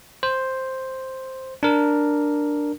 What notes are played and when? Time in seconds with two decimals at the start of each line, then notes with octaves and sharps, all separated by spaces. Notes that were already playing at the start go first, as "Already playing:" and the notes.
0.23 C5
1.63 D4 A#4